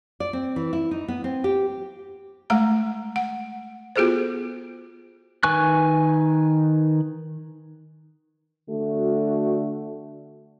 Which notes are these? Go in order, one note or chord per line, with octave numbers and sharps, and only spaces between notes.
D5
C4
E3
E4
D#4
B3
C4
G4
G#3 A3 F#5 A#5
F#5
B3 F4 F#4 G#4 A4 C5
D#3 B4 G#5 C#6 F#6
D3 A3 F#4